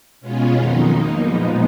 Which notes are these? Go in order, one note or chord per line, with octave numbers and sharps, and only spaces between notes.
B2 G#3 B3 C#4 F4
F2 D#3 F#3 D#4
B2 A#3
A#2 F3 G#3 B3